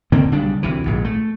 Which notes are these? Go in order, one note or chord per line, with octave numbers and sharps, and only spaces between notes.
D3 D#3 A#3 C4
B1 C#3 G3 D4
D2 C3 E3
A#1 G#2
A3